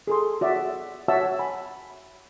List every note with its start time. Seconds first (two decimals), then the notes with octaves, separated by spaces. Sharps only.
0.07 G#4 A4 C6
0.41 F#4 D5 E5
1.08 F#4 C#5 E5 F#5 A5 E6
1.39 G#5 B5